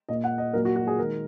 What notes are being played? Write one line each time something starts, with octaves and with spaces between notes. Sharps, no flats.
A#2 A#3 D#5
F#5
D#5
A#2 F#3 A#3 A#4
F#4
F#4
G#4
D#3 G#3 A#4